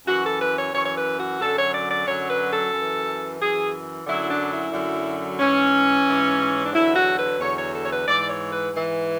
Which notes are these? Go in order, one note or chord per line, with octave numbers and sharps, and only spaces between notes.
F#2 E3 F#4
A4
B4
C#5
F#2 E3 C#5
C#5
B4
F#4
F#2 D3 F#3 A4
C#5
D5
D5
F#2 D3 F#3 C#5
B4
A4
F#2 E3
F#2 E3 G#4
F#2 D3 F#3 E4
D4
E4
F#2 D3 F#3
G#2 E3 C#4
G#2 E3
D4
E2 D3 F#3 E4
F#4
B4
E2 D3 F#3 C#5
C#5
A4
C#5
B4
G#2 E3 D5
C#5
B4
G#2 E3